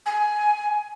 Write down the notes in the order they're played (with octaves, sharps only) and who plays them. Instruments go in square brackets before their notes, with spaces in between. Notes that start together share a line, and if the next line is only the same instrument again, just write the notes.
[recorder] G#5